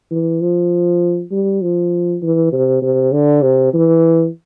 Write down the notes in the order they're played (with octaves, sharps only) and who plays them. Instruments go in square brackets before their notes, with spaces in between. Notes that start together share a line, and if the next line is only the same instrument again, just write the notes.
[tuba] E3
F3
G3
F3
E3
C3
C3
D3
C3
E3